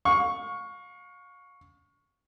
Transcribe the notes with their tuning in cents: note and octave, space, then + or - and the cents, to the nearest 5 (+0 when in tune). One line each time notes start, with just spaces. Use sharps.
F5 +35 C#6 +0